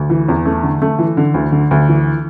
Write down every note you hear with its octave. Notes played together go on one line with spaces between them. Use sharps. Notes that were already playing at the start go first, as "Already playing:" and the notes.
Already playing: D2
E3
E2
A3
D3
A3
E3
D3
D2
D3
D2
E3